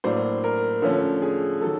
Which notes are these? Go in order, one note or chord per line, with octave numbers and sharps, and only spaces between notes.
A2 F#3 A#3 D4 C5
A#4
D3 F3 A3 C#4
G#4
D#3 F#3 A4